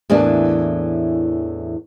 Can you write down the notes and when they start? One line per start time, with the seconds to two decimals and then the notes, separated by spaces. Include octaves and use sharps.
0.10 E2 A2 E3 A#3 D4